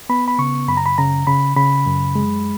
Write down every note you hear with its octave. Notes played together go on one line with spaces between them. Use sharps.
B3 B5
B5
C#3 C#6
F#2 B5
A#5
B5
C#3 A#5
C#3 B5
C#3 B5
F#2
G#3